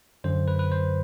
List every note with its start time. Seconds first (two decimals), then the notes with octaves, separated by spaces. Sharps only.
0.24 F#2 D3 F#3 C5
0.48 B4
0.59 B4
0.72 C5